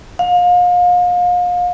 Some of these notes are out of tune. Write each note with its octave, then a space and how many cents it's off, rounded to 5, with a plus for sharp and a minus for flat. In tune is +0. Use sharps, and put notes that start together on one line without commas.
F5 +35